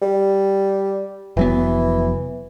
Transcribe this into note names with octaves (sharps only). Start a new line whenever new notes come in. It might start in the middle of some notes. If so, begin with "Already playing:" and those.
G3
F1 E3 F#3 B3